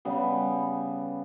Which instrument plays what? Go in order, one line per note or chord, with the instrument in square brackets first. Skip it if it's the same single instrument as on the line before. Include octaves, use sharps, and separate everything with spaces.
[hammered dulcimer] C#3 G3 B3